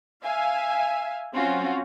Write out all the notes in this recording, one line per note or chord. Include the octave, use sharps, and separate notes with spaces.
E5 F5 G#5
F#3 C4 C#4 F4 F#4